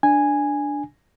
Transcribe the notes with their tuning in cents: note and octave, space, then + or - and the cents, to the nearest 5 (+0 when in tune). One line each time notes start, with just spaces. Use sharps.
D4 +0 G#5 -5